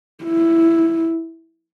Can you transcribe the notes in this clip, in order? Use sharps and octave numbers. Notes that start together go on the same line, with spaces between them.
E4